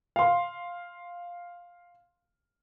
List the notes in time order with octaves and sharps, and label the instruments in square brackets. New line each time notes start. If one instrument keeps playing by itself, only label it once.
[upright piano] F5 C6